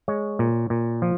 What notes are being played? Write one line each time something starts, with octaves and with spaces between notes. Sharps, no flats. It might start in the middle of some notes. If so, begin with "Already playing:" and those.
G#3 C#5
A#2
A#2
F3